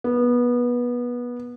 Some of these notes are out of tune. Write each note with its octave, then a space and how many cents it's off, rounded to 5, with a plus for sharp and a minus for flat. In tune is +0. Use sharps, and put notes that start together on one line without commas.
B3 -20